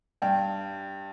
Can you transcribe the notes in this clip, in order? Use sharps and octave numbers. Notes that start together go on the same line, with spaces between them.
G2 G5